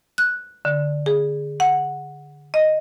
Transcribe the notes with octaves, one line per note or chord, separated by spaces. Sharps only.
F#6
D3
G#4
F#5
D#5